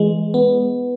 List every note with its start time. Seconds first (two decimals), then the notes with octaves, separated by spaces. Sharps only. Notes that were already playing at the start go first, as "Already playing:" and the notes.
Already playing: E3 G#3
0.34 B3